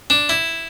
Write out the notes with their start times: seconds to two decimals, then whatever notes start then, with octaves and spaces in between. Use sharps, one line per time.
0.10 D4
0.29 E4